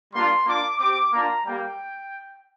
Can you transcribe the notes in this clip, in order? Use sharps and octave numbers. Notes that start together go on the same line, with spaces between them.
G3 A#3 D4 F4 C6
A#3 D4 F4 D6
C4 G4 D6
A#3 D4 F4 A#5
G3 A#3 G4 G5